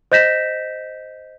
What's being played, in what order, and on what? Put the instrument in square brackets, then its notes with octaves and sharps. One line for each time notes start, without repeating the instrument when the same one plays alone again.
[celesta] C5 D#5 G6 A#6 B6 E7